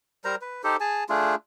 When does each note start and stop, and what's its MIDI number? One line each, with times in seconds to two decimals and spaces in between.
0.25 0.35 55
0.25 0.35 70
0.25 0.35 72
0.25 0.35 82
0.42 0.62 71
0.64 0.76 63
0.64 0.76 67
0.64 0.76 69
0.64 0.76 72
0.80 1.04 68
0.80 1.04 80
0.80 1.04 81
1.09 1.35 57
1.09 1.35 62
1.09 1.35 65
1.09 1.35 68